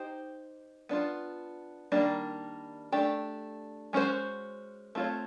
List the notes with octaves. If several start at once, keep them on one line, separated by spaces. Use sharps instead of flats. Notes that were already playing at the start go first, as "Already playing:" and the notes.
Already playing: D#4 G4 C5
B3 D4 F4
D#3 G3 A#3 D4
A3 D4 G4
G#3 C#4 F#4 A4 C5
A3 C4 F4 A4 C#5